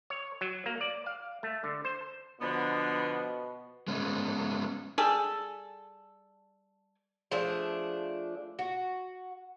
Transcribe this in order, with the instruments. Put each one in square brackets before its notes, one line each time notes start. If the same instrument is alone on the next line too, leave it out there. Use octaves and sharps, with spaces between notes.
[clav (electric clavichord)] C#5
F#3
A#3
D5
F5
A3
D3
C5
[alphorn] B2 [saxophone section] D3 F3 B3
[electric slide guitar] G#3 B3 C#4
[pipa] G3 G#4 A4
[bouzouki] F3 A3 D4 G#4
F#4